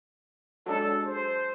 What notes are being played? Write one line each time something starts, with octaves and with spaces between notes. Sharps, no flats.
F#3 G#3 D4 A4
C5